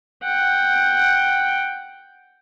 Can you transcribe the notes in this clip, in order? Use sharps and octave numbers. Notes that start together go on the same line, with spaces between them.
F#5 G5